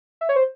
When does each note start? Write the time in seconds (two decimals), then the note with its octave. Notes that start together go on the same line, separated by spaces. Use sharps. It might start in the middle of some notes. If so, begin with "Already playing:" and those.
0.21 E5
0.29 C#5
0.36 C5